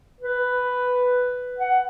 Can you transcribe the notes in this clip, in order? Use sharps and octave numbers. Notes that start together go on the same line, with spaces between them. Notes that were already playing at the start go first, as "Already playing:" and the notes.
B4
F#5